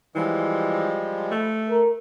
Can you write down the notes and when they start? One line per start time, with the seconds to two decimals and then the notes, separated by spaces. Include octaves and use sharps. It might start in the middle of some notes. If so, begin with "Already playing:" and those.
0.15 E3 F3 G3 G#3
1.32 A3
1.70 A#4